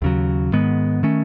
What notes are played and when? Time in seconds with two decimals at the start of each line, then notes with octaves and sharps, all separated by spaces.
0.02 D#2 C#3 F#3
0.52 G#2 D#3 G#3 B3
1.03 D#3 A3 C#4